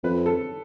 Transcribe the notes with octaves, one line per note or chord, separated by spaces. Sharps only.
F2 B4
A4